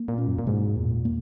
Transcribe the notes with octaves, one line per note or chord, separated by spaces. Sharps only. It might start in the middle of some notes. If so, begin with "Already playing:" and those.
Already playing: A#3
A#2
C#4
F#2
A#2
G#2 B2
E2 A#2
A#3